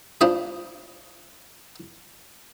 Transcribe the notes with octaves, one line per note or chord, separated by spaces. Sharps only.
D4 F4 C5 D#5 B5